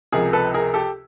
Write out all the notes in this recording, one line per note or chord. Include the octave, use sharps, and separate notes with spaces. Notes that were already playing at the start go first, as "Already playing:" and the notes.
C#2 C3 F3 G#4 A#4
A4 B4
G#4 A#4
G4 A4